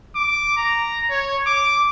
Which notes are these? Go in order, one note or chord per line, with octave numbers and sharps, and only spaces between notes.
D6
A#5
C#5
D6